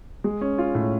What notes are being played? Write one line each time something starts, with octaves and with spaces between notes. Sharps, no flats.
G#3
C#4
F4
A2